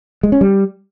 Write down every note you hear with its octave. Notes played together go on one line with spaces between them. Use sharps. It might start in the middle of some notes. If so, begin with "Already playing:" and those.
G#3
C#4
G3